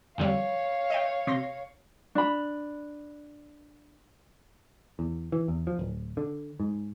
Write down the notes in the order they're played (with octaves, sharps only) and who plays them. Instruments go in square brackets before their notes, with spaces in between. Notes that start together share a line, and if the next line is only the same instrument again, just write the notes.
[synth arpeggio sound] F2 D3 G3 [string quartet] C#5 F5
[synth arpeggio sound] D#5 E5 G5
C3 C6 A#6
[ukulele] D4 B5
[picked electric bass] E2
E3
E2
F3
D1
D3
G#2